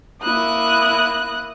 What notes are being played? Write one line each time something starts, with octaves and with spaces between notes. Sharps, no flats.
A#3 E4 D#6 F#6